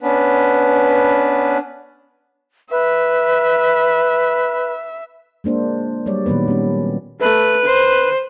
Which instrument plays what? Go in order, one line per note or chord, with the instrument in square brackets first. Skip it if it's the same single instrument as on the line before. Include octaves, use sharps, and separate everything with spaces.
[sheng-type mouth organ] B3 C#4 D4 B4
[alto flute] B4 [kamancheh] E5
[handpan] G#3 A#3 D4 C5
F#3 G3 C#5 D5
A#2 D#3 F#3 B3 B4
G3 C#4
[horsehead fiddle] A3 [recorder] B4
[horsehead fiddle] C5